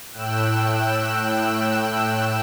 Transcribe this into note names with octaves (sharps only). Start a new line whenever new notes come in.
A2 G5 E6 F#6 E7